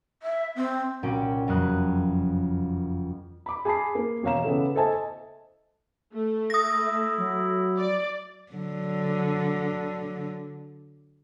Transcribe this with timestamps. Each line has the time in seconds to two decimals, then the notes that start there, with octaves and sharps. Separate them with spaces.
0.23 E5
0.56 C4
1.03 C2 A#2 C#4 F#4 G5 D6
1.47 F#1 F2 F#3 B3 D#6 F#6
3.46 B5 D6
3.65 G#4 G#5 A5 B5 C7
3.95 A#3
4.23 E1 C#5 F5 A#5 E7
4.44 C#3 B3 E4 A4
4.75 A4 C5 D#5 E5 G#5 A5
6.13 A3
6.50 E4 D#6 A#6
6.86 E5
7.18 F#3
7.78 D5
8.52 D3 F#3